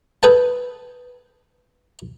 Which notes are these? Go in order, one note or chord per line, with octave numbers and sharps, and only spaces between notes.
G#4 A4 B4 G5 A5